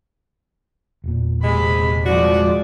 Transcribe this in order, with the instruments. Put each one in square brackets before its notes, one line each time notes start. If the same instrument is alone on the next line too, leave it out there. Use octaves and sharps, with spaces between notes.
[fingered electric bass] E1 A#2
[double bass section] C3 [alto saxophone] G#3 [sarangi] B5
[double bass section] F3 G#3 [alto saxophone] F#4 [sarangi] D5